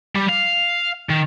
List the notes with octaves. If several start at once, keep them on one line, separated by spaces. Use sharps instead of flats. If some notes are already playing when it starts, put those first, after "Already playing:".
G3
F5
D#3